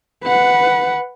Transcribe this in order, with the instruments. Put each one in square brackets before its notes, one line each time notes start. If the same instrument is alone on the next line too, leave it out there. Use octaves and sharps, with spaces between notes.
[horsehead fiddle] B4 F#5